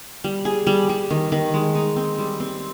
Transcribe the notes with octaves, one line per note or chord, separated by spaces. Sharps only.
G3
G#4
G3
G3
D#3
D#3
G#3
D#4
C4
G3
C4